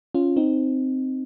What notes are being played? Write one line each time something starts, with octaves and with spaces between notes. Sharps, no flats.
C#4 F4
C4 D#4